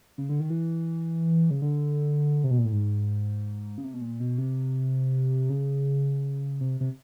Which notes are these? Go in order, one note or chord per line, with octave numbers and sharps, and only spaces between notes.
C#3
D3
D#3
E3
C#3
D3
C3
B2
A#2
A2
G#2
C#3
C3
B2
A#2
B2
C3
C#3
C3
C3